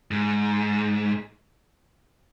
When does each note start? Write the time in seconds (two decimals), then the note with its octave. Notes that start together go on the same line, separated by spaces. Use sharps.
0.11 G#2